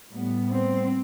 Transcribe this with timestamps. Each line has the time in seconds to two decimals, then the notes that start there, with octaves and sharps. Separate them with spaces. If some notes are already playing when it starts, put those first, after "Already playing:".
0.10 A2 G3 B3
0.52 C4